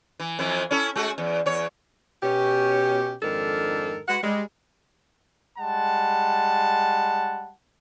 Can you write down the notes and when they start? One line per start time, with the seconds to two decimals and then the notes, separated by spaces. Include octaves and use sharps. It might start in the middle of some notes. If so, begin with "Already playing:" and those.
0.20 E3
0.39 F2 E3 E4
0.71 C#4 E4 A4
0.96 G#3 A3 F#4
1.18 E2
1.46 E2 C#5
2.23 B2 C#4 G4
3.22 F2 G#2 D#3 D4 A4 A#4
4.08 G#3 F#4 B4 F#5
4.23 G3 G#3
5.58 G3 G#3 F#5 A5